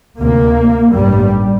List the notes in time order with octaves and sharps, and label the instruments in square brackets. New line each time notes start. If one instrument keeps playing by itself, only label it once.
[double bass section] D2 C3 A#3
A1 G2 G3